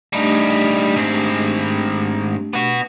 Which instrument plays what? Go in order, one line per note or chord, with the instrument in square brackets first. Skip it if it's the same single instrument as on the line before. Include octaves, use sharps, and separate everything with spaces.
[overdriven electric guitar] G3 D#4 [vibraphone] A3 D4 G4
[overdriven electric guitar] G#2 C4
B3 F#4